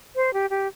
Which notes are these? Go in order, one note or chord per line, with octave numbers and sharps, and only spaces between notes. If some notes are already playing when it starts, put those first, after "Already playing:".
C5
G4
G4